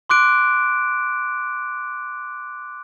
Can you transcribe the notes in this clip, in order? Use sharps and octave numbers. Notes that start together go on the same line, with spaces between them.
C6 D6 F#6 D7